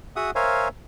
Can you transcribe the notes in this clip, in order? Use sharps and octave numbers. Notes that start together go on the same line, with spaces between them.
F#4 G#4 E5 F#5 D#6
A#4 C5 C#5 E5 F5 G#5